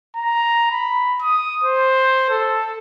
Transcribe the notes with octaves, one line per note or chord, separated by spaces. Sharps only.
A#5
B5
D#6
C5
A4